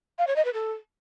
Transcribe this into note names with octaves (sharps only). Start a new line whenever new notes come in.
F5
C#5
D#5
B4
A4